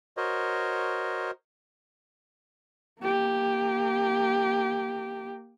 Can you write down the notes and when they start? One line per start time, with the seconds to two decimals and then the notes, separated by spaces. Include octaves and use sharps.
0.17 F#4 A#4 C5 C#5 D#5
3.02 A#3 G4